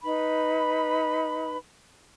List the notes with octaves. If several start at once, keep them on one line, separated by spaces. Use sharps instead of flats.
D#4 B4 B5